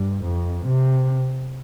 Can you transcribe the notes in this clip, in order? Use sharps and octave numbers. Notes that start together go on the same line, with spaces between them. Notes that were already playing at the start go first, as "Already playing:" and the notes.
Already playing: G2
F2
C3